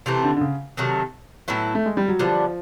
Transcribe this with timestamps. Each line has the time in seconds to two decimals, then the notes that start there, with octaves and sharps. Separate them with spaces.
0.06 C3 E3 A3 C4
0.24 D3
0.37 D3
0.41 C#3
0.77 C3 D#3 F#3 A3
1.48 A2 F#3 B3 E4
1.75 A3
1.86 G#3
1.97 G3
2.08 F#3
2.19 D3 F3 G3 B3